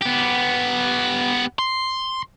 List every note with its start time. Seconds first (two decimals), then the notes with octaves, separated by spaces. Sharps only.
0.01 B3 G4
1.59 C6